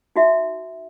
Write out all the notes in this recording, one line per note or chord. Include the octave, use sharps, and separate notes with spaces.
D#4 F#4 E5